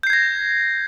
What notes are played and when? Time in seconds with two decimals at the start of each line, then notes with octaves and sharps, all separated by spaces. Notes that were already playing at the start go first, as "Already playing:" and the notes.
0.03 G6
0.07 C7
0.10 G#6
0.13 A#6